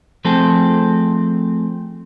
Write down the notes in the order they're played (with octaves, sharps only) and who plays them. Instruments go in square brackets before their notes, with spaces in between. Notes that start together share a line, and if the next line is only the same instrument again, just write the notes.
[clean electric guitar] F3 A3 C4 G#4 A4